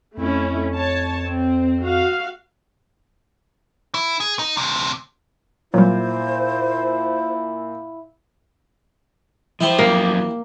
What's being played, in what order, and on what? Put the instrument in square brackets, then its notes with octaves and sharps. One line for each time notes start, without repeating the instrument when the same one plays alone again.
[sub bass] F2 [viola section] A3 C#4 E4
[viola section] C#5 A5
C4
F#4 F5
[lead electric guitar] E4
G#4
D#4
D2 C3
[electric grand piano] A#2 [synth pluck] F#3 G3 [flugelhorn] E4 [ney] C5
[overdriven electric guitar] F3 C5 [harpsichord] E4 G4
[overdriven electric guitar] F#2 F3 [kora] A#3